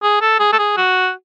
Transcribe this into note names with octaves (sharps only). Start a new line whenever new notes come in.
G#4
A4
G#4
A4
G#4
F#4